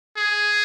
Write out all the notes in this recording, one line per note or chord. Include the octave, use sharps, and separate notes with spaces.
G#4